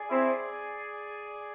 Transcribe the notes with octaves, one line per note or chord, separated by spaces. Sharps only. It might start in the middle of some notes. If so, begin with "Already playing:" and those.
Already playing: G#4 D5 G#5
C4 E4